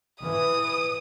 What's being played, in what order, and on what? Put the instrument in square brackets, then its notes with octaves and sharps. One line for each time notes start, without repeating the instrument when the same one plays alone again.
[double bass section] E3 [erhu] D#6